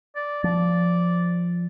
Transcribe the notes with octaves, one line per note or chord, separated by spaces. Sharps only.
D5
F3 D5